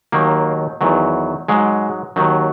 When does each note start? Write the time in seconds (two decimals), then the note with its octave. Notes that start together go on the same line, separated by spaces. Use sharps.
0.12 D#2 D#3 F#3 A#3
0.81 E2 D#3 F#3
1.48 G#2 F#3 G#3
2.16 D#2 D#3 F#3